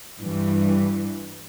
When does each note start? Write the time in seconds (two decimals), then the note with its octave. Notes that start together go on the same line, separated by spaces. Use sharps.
0.19 G2 E3 G3